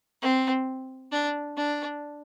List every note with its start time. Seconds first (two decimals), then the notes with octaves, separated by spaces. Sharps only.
0.22 C4
1.12 D4
1.57 D4